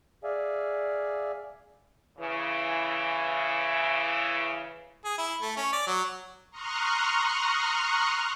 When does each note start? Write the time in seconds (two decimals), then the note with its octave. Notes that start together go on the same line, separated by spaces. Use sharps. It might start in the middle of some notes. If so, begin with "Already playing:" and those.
0.24 G#4 D5 E5 F5 G#5
2.18 C#3 E3
5.05 G#4
5.18 E4
5.42 A3
5.57 C#4
5.73 D5
5.87 F#3
6.50 A#5 C6 C#6 D#6 F6 F#6